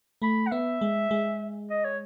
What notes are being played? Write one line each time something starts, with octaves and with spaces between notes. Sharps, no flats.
A3 B5
F#5
B3 E5
G#3
G#3
D#5
C#5